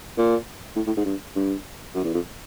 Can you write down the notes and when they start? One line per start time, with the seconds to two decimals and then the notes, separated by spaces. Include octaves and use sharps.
0.18 A#2
0.76 A2
0.87 A2
0.97 G#2
1.05 G2
1.36 G2
1.95 F#2
2.04 E2
2.14 F2